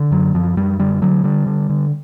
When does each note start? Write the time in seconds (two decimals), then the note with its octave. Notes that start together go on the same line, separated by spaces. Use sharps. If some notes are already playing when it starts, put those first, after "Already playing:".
Already playing: D3
0.11 F#2 F#3
0.34 F#2 F3
0.57 F#2 G3
0.79 D3 G3
1.02 D3 F#3
1.24 D3 G3
1.47 D3
1.70 D3